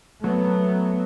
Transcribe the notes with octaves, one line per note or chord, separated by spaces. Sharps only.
F#3 A3 B3